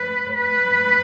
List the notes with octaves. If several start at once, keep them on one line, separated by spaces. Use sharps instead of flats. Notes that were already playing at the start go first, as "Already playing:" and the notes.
Already playing: B4
B4